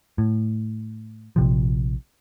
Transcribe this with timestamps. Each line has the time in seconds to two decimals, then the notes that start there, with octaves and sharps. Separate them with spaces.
0.18 A2
1.36 A#1 C3 F3